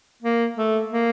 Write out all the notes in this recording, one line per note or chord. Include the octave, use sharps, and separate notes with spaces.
A#3
A3
A#3